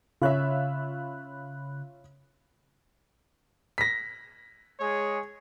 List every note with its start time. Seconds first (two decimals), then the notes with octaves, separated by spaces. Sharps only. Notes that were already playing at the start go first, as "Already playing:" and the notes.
0.22 C#3 F4 C#5 E5 B5 F#6
3.78 A#6 B6
4.80 G#3 G#4 C#5